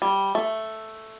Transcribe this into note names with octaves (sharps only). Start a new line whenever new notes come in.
G3
A3